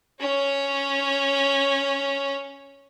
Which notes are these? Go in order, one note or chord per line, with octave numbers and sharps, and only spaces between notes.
C#4 C#5